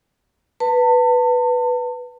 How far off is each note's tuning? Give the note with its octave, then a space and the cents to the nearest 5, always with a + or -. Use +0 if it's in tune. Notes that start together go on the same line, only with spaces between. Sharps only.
B4 +0 A5 +35